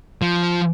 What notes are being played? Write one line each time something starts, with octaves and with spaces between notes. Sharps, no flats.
F3